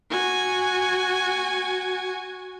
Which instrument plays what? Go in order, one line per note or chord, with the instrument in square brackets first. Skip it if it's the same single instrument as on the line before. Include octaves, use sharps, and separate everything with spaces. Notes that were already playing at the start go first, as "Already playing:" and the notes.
[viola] F#4 G#5